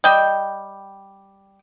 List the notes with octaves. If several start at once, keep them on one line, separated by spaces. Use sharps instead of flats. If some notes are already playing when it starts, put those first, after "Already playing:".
G3 D#5 G5